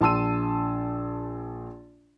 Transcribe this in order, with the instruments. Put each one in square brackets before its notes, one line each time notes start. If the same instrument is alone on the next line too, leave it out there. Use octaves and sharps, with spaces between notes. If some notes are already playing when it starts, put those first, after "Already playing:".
[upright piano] A#1 A5 C6 E6 D#7